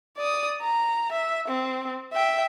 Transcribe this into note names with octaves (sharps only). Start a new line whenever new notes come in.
D5 D#6
A#5
E5
C4
E5 G5